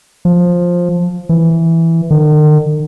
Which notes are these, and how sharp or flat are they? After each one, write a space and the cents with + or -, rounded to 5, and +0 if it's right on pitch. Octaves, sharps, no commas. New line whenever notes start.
F3 +10
E3 +0
D#3 -45